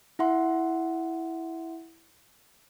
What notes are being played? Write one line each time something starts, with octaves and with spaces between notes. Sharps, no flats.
E4 E5 F#5 C6